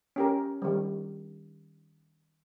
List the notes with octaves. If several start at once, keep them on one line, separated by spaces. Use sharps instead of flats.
C#4 G4 A#4
D#3 G3